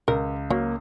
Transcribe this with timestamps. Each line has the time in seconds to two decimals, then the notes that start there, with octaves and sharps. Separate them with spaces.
0.08 C#2 A#4
0.50 F#3 A#3